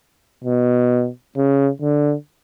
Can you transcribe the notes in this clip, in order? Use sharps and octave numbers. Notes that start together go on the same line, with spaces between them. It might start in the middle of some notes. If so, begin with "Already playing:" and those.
B2
C#3
D3